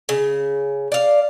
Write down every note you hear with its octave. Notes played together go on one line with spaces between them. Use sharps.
C#3
D5 F5